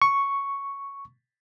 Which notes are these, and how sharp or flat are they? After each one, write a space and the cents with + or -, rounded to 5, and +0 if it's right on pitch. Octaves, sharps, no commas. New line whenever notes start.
C#6 +0